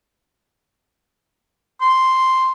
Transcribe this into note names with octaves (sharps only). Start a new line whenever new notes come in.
C6